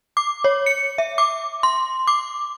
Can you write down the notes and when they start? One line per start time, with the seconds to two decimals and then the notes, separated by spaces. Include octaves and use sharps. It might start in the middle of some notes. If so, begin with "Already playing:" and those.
0.17 D6
0.44 C#5
0.66 C#7
0.98 E5
1.18 D6
1.63 C6
2.07 D6